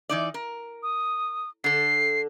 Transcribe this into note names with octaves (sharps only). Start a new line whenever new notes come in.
E3 D#4 D5
A#4
D#6
D3 A4 C7